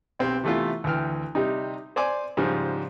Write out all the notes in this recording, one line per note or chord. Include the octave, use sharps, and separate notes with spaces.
B1 C4 G4
C3 E3 A3 B3 F4
D2 E3 G5 F6
C3 G3 D#4
C5 D5 G#5 D6
G#2 C#3 F3 G3